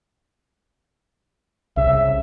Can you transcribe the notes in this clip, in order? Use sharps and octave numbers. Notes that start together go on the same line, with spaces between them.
C2 C#3 E5